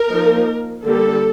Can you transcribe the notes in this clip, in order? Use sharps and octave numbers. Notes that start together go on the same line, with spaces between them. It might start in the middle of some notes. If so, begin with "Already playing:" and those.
Already playing: A#4
F3 A#3 D#4
D3 G3 A#3 A4